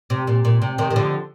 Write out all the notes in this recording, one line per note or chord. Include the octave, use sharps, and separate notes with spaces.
C3
A#2
A#2
C3
C3 D#3
D#3
D3 F3